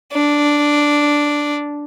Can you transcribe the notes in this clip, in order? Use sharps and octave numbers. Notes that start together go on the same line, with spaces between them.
D4